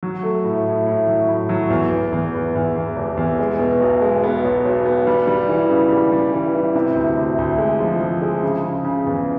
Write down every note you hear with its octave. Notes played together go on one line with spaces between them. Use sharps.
F#3
A3
A2
A2
A2
F#3
A2
F#3
E2
E2
E2
E2
E2
E2
F1
E2
G#3
B2
B1
G#3
B3
B1
B1
B3
G3
G3
E3
C#3
G3
G3
E3
E3
C3
D2
D2
D2
G#3
F3
F3
G#3
C#3
C#3
C#3
E2